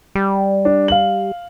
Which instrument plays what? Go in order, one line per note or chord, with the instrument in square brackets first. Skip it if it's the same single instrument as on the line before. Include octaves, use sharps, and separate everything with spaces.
[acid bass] G3
[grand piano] D4
F5 F#7